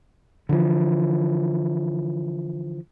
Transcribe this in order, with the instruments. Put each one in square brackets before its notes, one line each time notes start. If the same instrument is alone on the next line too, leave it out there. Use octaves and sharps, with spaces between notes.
[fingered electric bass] D3 E3 F3